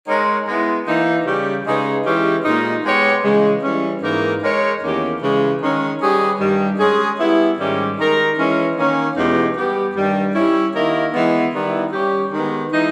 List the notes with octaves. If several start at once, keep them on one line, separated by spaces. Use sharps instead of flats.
G#3 D#4 A#4 C#5
G#3 B3 E4
E3 A#3 D#4
C#3 G3 C#4 G4
C#3 G#3 D#4 G#4 B4
E3 G#3 C#4 G4
A#2 G#3 D#4
G#3 B3 G4 C#5
C#3 E3 G#3
E3 G3 C#4
G#2 E3 A#3 D#4 A#4
G#3 D#4 A#4 C#5
E2 D#3 A#3 C#4 G4
C#3 E3 G#3
D#3 G#3 C#4
G3 C#4 G#4 B4 D#5
G2 D#3 G3
G#3 C#4 G#4
G3 B3 E4
G#2 D#3 G3 C#4 G4
D#3 G#3 D#4 A#4
E3 G#3 C#4
D#3 A#3 C#4
E2 B2 G#3 D#4 G4
G3 B3 G4
G2 D#3 G3
G3 C#4 E4
D#3 A#3 E4 A#4 D#5
E3 G#3 B3
D#3 G3 B3 E4
G3 C#4 G4
D#3 G#3 B3
E3 G#3 D#4